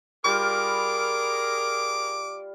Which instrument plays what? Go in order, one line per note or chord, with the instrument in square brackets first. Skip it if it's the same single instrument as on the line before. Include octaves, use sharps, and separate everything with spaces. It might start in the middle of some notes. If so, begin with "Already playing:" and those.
[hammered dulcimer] G3 F4 [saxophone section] G#4 A#4 [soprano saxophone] D6